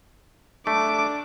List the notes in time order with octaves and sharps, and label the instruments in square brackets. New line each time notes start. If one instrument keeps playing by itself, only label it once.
[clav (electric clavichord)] A3 [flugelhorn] D4 [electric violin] D6